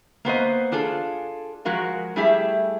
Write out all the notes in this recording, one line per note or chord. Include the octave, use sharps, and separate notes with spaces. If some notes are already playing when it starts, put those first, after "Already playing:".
A#3 B3 C5 D#5
D4 F4 G#4 A4
F3 G#3 F#4 A#4 F5
G3 A3 E4 G4 G#4 E5